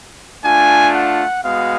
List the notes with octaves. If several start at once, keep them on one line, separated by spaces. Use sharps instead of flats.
A3 D4 F4 G#5
F#5
G#3 B3 F#4 F5